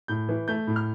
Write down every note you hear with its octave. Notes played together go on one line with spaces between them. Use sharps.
A2 G6
E3
A3 G6
A2
F6